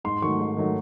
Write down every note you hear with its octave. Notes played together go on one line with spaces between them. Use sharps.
G#2 C6
D#3 F#3 A3 C#6
G#2
D#3 F#3 A3